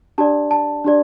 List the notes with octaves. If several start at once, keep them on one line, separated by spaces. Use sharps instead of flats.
D4 G4 D5 A5
A5
D4 G4 D5